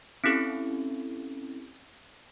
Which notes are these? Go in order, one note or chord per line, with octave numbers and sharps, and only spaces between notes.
C4 C#4 E4 G4 A4